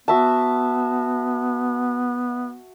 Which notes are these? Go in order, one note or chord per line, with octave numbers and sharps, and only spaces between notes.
B3 F#4 E5 A5